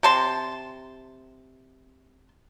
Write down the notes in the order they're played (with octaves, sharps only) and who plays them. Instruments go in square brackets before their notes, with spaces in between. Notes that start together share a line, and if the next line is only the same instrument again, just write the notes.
[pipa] C3 A5 C6